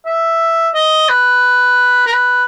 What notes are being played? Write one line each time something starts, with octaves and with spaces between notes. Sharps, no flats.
E5
D#5
B4
A#4
B4